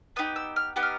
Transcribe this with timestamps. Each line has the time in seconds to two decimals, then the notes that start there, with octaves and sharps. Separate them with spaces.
0.16 B3 D#4 G4 D#6
0.36 E6
0.56 F6
0.76 B3 D#4 G4
0.83 F6